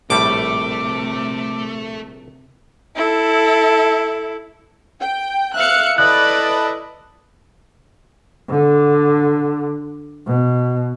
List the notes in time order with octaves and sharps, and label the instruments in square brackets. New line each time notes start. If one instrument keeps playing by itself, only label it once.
[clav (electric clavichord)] A#1 A2 G3 [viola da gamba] C3 [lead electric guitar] A3 [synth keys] D6
[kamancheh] E4 A4
[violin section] G5
[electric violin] E5 F5 [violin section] F#6 C#7
[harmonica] E4 A4 D#5 [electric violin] B4 B5 [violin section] D5 [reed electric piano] F#6
[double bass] D3
B2